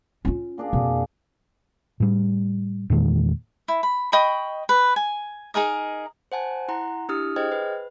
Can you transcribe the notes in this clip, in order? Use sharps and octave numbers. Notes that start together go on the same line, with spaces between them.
C#4 F4
A#2 D4 G#4
F2 B2
A2 G3
E2 A#2 D#3 G#3
E4
B5
D#5 G5 B5 C#6
B4
G#5
D#4 G#4 A#4 D#5
C5 F#5 G#5 A5
E4 F#5 A#5 C6
D4 E4 G4 D#6 F6
G#4 C5 D#5 G5 F6 G#6
B4